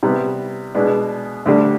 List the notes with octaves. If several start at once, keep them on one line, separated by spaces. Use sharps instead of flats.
C3 G3 B3
B2 G#3 B3 D4
D2 D3 G3 D4